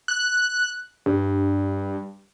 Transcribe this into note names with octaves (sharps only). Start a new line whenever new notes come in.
F#6
G2